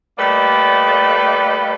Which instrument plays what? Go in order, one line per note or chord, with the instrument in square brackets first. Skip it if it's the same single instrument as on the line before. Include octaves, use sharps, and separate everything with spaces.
[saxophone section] G3 A3 A#3 B4 D5 D#5